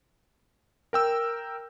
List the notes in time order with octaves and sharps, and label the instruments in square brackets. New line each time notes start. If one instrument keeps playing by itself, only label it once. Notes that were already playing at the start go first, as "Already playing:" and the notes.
[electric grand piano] A#4 G5 E6